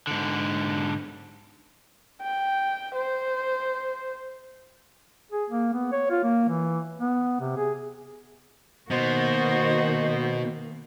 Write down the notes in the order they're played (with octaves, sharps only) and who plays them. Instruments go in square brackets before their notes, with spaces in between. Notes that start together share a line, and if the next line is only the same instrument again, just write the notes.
[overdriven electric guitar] G#2 D3
[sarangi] G5
C5
[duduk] G#4
A#3
B3
C#5
F4
A#3
E3
B3
C3
G#4
[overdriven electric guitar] B2 [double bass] D#3 A#3 [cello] D#4 F#4 [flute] C5